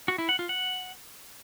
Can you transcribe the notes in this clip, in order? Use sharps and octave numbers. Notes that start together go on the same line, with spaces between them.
F#4
E4
F#5
F4
F#5